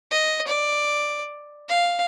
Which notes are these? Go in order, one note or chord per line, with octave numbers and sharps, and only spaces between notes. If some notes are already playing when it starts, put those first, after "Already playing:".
D#5
D5
F5